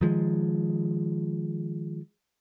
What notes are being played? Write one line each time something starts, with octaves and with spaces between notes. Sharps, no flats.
D#3 F3 G#3